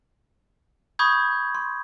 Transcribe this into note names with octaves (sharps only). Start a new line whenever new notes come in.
B5 C#6 D#6 G6 G#6
C6